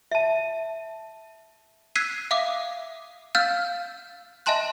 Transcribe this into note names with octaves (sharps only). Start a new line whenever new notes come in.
E5 A5
E6 F#6 G#6 B6 C7 D#7
E5 F5 D6 D#6
F5 E6 F6 G6 A6
D#5 E5 G#5 A5 C6 F#6